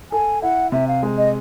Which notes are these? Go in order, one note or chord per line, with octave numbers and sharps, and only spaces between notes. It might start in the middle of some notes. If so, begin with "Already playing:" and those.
A4 G#5
E4 F#5
C3 E5
F5
G#3
D#5